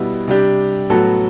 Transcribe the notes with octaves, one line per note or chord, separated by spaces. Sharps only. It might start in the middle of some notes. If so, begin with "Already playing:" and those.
Already playing: B2 G3 B3 E4
C3 G3 D4 G4
A2 F#3 B3 F#4 A4